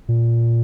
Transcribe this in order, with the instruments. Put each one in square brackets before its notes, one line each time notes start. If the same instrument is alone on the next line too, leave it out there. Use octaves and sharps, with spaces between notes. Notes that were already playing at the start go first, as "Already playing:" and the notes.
[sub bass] A#2